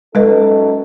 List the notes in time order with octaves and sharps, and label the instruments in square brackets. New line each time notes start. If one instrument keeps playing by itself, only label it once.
[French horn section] F#2 D#4 A4 [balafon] G#3 B4 D#5